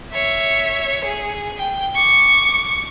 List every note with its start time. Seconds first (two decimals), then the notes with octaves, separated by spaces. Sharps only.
0.12 C#5 E5
1.05 G#4
1.58 G5
1.95 C#6 D6